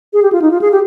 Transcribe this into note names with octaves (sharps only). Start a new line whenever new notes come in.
G#4
G4
F4
D#4
F4
G#4
G4